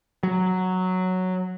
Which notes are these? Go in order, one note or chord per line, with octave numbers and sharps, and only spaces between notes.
F#3